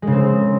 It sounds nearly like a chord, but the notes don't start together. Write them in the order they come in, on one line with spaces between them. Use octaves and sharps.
G#3 C#3 C4